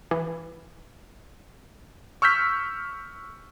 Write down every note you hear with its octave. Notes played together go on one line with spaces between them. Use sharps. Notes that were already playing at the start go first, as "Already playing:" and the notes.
E3
C#6 E6 F6 G6 B6